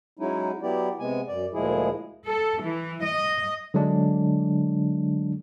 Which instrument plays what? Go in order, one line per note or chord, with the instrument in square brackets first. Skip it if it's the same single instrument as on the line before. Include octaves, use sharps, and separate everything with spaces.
[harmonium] F#3 G#3 C#4 D#4 E4
F#3 B3 E4 G4 D5
C3 G#3 B3 G#5
F#2 D5
D2 A#2 F3 G#3 E4 G#4
[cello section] A4
E3
D#5
[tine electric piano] D3 F#3 G#3 D4